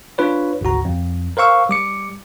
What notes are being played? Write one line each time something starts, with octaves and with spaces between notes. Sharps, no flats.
D4 F4 B4 C#5
G#1 D2 C#3 F#4 A#5
F2
A#4 C5 F5 C#6 E6
G3 D6 C#7